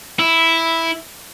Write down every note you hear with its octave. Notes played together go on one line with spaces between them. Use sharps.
E4